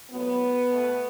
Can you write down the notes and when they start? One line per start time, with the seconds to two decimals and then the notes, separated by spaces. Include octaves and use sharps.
0.11 A2 F#3 A3 B3
0.68 B2 A3